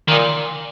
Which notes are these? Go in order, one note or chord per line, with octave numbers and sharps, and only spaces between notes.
A#2 D#3